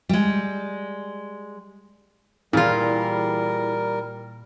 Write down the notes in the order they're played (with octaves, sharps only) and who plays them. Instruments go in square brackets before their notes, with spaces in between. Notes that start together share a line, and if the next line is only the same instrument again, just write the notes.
[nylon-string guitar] G3 G#3
[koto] A#2 F4 [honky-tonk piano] E3 G#4 [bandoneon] G3 A#4